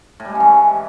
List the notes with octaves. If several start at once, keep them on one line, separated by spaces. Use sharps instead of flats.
A2
G3
G#3
C#3
E3